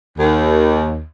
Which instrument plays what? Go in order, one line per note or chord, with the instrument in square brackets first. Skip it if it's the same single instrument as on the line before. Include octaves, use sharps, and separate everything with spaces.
[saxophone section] D#2